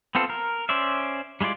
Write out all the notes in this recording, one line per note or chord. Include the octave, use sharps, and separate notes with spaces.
B3 C4 F4 A4
A#4
C#4 C5 D5 E5
G3 G#3 E4 F4 D5